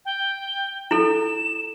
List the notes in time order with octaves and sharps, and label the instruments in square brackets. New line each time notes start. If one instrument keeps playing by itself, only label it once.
[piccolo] G5
[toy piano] E4 A4 [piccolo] E7